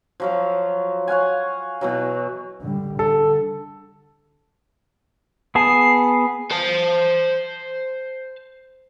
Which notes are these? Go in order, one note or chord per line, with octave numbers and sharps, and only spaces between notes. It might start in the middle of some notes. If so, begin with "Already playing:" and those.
F3 F#3 F5
C#5 F5 F#5 G#5
B2 E3 F#3
D3 G3
D3 A4
B3 G#4 A5 C7
C5 A5